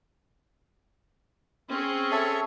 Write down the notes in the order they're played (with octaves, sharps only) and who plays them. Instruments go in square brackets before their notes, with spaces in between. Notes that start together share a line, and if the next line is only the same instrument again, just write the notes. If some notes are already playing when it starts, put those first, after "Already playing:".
[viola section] C4 C#4 G#4
[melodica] A4 C#5 E5